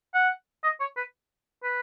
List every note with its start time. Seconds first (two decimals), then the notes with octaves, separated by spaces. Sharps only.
0.14 F#5
0.64 D#5
0.80 C#5
0.97 B4
1.63 B4